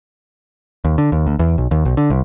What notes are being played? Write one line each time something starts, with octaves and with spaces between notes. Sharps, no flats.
D#2
D3
D#2
D2
E2
B1
D#2
B1
D3
C2